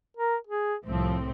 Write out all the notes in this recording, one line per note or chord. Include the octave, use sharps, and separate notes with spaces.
A#4
G#4
C2 A2 F3 C4